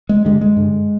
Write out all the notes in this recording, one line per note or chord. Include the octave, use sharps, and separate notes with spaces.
G#3
G2 D3 G#3
G#3
G2 D3